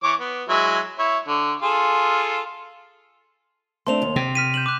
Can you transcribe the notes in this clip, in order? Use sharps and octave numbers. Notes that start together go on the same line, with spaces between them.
E3 C#5 D6
B3
F#3 G#3 E4
E4 C#5
D3
F4 G#4 A4
A3 C4 D4 C6 F7
D#2
C3 G5
F6 B6 D#7
G6 E7 F#7
D6 F#6